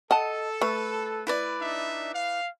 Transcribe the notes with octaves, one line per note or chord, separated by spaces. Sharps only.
A4 D#5 F#5 A5
A3 B4
E4 B4 D5
D4 D#4 E5
F5